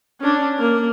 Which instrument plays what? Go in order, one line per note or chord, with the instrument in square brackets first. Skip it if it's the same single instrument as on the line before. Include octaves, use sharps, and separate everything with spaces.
[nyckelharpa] C#4 D4
A#3 A#4